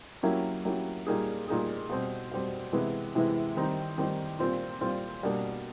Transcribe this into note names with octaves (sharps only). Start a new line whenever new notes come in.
F#3 A#3 C#4 E4 G4
F#3 A#3 C#4 E4 G4
A#2 G3 A#3 D#4 G#4
A#2 G3 A#3 D#4 G#4
B2 G3 C4
B2 G3 C4
C3 E3 G#3 B3 E4
C3 E3 G#3 B3 E4
D#3 G3 C4 D#4
D#3 G3 C4 D#4
A#2 G3 C4 F4
A#2 G3 C4 F4
B2 G3 A#3 D4